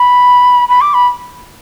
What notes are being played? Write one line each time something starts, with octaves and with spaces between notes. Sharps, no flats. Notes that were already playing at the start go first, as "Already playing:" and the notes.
Already playing: B5
B5
D6
B5